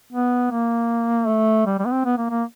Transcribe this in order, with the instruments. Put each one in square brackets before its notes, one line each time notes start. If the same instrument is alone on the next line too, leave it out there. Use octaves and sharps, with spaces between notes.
[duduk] B3
A#3
A3
G3
G3
B3
C4
B3
A#3
A#3